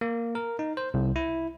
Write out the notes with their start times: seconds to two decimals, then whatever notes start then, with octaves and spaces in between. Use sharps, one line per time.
0.01 A#3
0.35 A#4
0.59 D#4
0.77 C5
0.94 C2
1.16 E4